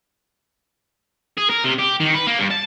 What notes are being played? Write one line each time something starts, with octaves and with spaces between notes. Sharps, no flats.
G#4
A#4
C3
G4
D#3
B4
A#3
G2
A5